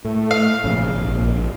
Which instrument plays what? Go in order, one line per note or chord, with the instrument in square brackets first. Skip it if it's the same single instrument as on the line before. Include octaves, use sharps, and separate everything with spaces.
[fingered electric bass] A2 [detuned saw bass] A3
[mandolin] F5
[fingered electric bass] G#1 A#2 F3 [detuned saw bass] C#3
[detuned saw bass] A#1